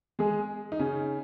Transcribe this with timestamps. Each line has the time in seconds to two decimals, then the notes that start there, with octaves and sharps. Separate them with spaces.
0.19 G#3 G#4
0.72 D#4
0.79 C#3 C#4